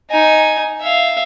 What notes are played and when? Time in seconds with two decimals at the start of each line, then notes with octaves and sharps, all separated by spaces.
0.10 D#4 G#5
0.81 E5 F5